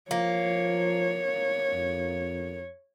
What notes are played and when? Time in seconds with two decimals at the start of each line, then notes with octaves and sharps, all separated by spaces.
0.11 F3 A#3 C#5
1.73 F2